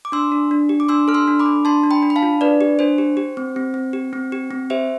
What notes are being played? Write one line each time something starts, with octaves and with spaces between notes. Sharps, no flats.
D6
D4 C6 E6
D4
D4
G4
D6
D4 C6 E6
A4 F6
C6 E6
D4
B5 D6
D4
D4 A5 C6
D4
G5 B5
D4
B5
F5 A5
F4
D4 B4 D5
G4
D4 C5
G4
G4
C4
C4
C4
G4
C4
G4
C4
G4 C5 E5